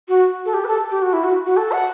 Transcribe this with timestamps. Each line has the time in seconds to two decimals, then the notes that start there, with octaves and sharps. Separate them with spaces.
0.09 F#4
0.46 A4
0.54 G4
0.64 B4
0.68 A4
0.90 G4
1.02 F#4
1.13 E4
1.24 F#4
1.46 F#4
1.57 A4
1.72 F#5